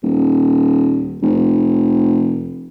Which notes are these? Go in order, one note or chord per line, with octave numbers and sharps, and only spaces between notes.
D#1
F1